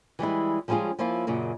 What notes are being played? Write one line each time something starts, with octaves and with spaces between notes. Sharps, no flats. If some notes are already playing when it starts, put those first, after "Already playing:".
E3 G3 G#3 E4
F3 G3 G#3 C#4 F4 G#4
F3 A#3 C#4 E4 F4
F#2 A#2 C#3